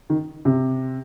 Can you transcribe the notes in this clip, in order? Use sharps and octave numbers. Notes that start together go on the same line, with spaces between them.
D#3
C3